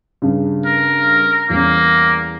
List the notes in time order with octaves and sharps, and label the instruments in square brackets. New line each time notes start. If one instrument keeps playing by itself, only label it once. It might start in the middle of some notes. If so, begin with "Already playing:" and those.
[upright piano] G2 C#3
[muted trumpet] A#4
[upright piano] E2 G3 C#4 [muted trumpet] A#3